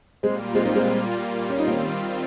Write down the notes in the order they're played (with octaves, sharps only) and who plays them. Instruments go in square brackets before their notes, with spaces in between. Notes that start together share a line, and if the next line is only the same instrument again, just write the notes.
[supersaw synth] A#2 G3 A#3 F4 [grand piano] G#3 C4
[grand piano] G#3 C4
C4 D#4
G#3 C4
[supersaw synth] D#3 G3 C4 F4 [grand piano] C#4
[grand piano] D#4
A#3 C#4